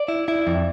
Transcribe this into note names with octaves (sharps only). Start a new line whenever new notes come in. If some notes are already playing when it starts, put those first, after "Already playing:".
Already playing: D5
E4
E4
F2